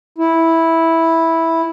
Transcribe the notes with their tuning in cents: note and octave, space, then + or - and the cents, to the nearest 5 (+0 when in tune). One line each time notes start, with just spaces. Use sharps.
E4 -5